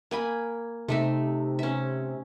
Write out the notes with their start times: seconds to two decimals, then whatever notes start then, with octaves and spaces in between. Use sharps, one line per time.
0.11 A#3 G#5 B5
0.88 C3 A3 D#4 E5
1.59 C#4 E5